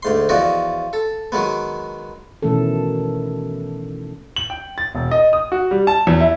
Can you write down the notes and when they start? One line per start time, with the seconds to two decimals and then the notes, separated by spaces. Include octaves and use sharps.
0.03 D2 G#2 C6
0.29 E2 F3 F#4 D5 D#5
0.93 A4
1.32 D#3 F#3 G#3 B3
2.42 B2 D#3 E3 A3 C#4 A4
4.36 F#7
4.50 G5
4.78 A6
4.95 E1
5.11 D#5
5.33 D#6
5.52 F#4
5.71 G3
5.87 A5
6.07 E2
6.20 E4